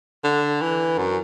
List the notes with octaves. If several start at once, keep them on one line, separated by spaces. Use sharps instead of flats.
D3
E3
F#2